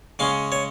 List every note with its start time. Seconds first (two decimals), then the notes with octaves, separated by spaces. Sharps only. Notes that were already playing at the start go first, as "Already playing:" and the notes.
0.19 C#3 G#3 C#4 F5
0.52 C#5